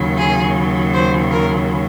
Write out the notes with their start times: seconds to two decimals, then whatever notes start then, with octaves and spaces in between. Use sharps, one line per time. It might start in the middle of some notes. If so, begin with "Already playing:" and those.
Already playing: D#2 C#3 F#3
0.17 G#4
0.93 C5
1.31 A#4